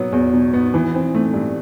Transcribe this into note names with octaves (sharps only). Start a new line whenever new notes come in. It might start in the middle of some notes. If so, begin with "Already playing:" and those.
Already playing: B2 F#3 B3
E2
B2
B3
E3
C4
A3
G2